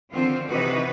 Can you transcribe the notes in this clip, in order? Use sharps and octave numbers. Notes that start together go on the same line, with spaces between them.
D3 D#3 F3 C4 F4
C3 E3 D#4 F#4 B4